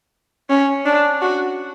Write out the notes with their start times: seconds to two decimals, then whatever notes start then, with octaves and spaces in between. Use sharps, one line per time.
0.49 C#4
0.86 D4
1.22 F#4